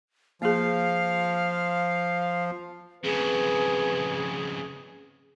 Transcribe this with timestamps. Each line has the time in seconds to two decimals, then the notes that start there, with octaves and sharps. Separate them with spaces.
0.42 F3 A#3 G#4 F5
3.04 F2 C#3 G#4 B4